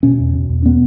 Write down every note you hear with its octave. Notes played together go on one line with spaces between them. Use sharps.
B2 C#4
E2
B2
E2
B2 B3